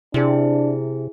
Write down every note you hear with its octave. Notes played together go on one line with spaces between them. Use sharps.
C3 D4 E4 G#4